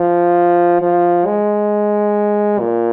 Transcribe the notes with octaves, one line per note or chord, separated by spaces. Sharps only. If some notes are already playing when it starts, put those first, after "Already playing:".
Already playing: F3
F3
G#3
A#2